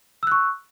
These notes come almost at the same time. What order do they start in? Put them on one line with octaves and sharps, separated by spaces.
E6 F#6 C#6